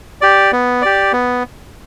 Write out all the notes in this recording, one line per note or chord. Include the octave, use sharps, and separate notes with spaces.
G4 D5
B3
G4 D5
B3